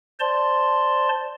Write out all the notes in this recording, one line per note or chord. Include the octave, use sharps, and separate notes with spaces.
C5 D5 A5 C6